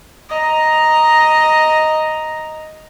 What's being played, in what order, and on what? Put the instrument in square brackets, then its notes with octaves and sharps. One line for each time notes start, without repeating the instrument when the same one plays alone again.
[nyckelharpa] D#5 A#5